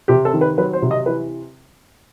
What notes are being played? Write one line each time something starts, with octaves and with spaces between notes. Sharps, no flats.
C3 G4
A4
D#3
B4
F#3 B4
C5
C3
D#5
E3 B4